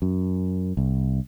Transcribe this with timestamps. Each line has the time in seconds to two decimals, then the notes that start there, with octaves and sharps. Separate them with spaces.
0.02 F#2
0.77 C2